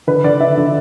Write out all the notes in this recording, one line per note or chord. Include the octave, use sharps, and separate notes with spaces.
D3 B4
D3 D5
D3 E5
D3